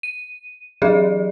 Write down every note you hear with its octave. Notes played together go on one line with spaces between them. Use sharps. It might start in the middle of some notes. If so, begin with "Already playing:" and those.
D#7
E3 F#3 G4 G#4 D5 D#5